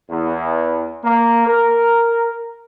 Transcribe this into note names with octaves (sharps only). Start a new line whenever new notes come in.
E2
A#3
A#4